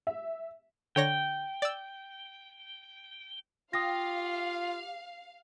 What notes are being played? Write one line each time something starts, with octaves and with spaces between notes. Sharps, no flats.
E5
D3 C#5 G5 A#6
D5 E6
F4 G4 F5 D#6 A#6